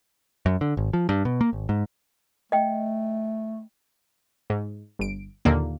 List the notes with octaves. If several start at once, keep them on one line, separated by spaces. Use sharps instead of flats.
F#2
D3
G#1
F3
G2
B2
A#3
G#1
G#2
A3 D#5 G5
G#2
G1 D7
D#2 A#2 D3 A#3